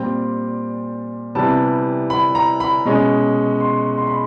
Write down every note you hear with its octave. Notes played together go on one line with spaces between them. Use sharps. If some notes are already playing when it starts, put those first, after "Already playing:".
Already playing: A#2 G3 C4 G5
C3 E3 G3 B3 A5
B5
A#5
B5
B2 G#3 C#4
C6
C6
B5